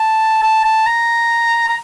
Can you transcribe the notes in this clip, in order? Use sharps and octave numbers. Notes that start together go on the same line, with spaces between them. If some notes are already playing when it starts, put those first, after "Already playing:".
Already playing: A5
A5
A5
A#5
A#5